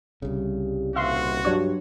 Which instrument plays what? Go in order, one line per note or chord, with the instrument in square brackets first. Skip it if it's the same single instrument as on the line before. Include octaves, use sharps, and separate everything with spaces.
[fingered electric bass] C2 C#3 [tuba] G3
[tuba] D#1 [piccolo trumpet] F#4 [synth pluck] E5 F5 C6
[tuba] G2 [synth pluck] F#3 D4 C#5